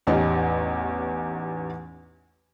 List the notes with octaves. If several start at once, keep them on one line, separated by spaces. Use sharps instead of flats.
A1 E2 C#4 D#4 G4